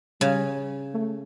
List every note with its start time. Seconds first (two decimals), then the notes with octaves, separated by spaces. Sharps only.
0.20 C#3 G3
0.94 A3